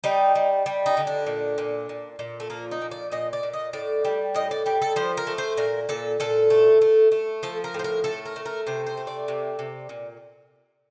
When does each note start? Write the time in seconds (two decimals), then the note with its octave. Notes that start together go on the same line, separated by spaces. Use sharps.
0.04 G3 D#4
0.35 G3
0.66 G3
0.86 D#4
0.97 D3
1.07 D4
1.26 A#2
1.58 A#2
1.89 A#2
2.19 A#2
2.40 A3
2.50 F3 A#3
2.71 D#4
2.82 A#2
2.91 D5
3.12 A#2 D#5
3.33 D5
3.43 A#2
3.53 D#5
3.73 A2 D5
4.05 G3
4.34 A2 D#5
4.51 D5
4.66 G3 G4
4.82 A4
4.96 F3 C5
5.17 A#4
5.27 A3
5.38 C5
5.57 A#2 A#4
5.89 A#2 A4
6.20 A#2 A4
6.50 A3
6.82 A3
7.12 A3
7.43 F3 A4
7.64 A#4
7.74 A2 C5
7.84 A#4
8.04 A3 A4
8.25 A#4
8.36 A3
8.45 A#4
8.67 C3 C5
8.87 C5
8.97 A3
9.07 D5
9.28 C3
9.59 C3
9.89 A#2